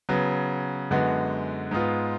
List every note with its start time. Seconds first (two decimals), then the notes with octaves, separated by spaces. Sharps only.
0.09 C#3 F#3 B3
0.91 F#2 D3 G#3 B3 F#4
1.71 G#2 G#3 B3 F4